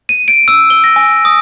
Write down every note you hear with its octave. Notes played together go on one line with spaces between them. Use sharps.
D#7
D7
E6
G7
A#6
G#5
D#6